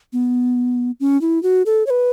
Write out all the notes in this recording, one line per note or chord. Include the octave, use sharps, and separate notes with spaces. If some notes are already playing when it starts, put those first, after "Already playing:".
B3
C#4
E4
F#4
A4
C#5
B4